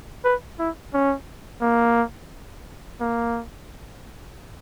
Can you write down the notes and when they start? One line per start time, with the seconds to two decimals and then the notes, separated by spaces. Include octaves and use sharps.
0.24 B4
0.59 E4
0.94 C#4
1.61 A#3
3.00 A#3